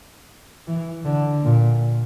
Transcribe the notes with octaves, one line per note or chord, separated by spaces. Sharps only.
E3
D3
A#2